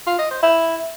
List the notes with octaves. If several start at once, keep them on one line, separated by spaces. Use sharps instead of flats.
F4
D#5
C5
E4